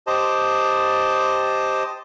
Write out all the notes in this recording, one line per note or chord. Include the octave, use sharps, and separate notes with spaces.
G4 C5 D#5 A5